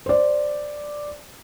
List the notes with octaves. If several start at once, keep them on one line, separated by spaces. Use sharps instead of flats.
C5 D5